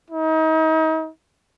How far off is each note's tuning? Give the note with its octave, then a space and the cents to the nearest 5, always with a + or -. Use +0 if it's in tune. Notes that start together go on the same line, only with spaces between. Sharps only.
D#4 +35